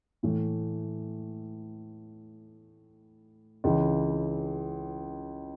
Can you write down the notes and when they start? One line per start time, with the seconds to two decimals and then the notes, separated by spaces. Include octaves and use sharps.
0.23 A2 E3 A3
3.64 C#2 C#3 E3